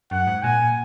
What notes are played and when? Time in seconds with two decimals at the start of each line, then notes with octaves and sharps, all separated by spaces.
0.11 F#2 F#5
0.27 G#2
0.43 A#2 G#5